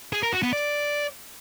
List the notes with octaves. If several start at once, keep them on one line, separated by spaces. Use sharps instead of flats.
G#4
A#4
F#4
B3
D5